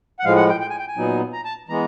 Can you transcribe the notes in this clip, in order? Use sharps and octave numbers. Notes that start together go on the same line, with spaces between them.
F#5
A2 F3 G#3 F5
F#5
G5
G5
G#5
G5
G#5
A#2 F#3 B3 D#4
A#5
A5
E3 G#3 B3 A#5